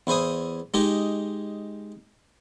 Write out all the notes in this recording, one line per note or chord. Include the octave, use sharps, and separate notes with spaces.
E2 E4 C5 G#5 D#6
G#3 D#4 G4 G#4